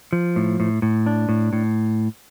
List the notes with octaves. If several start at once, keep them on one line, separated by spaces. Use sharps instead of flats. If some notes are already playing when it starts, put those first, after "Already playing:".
F3
A2
A2
A2
D4
A2
A2